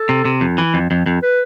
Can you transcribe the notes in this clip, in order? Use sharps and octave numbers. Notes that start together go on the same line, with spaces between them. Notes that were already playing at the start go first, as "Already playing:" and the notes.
Already playing: A4
C3
C3
F2
E3
F2
F2
F2
B4